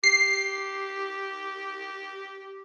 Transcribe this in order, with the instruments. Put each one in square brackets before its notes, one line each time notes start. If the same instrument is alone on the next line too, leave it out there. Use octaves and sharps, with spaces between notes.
[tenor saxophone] G4 [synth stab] C7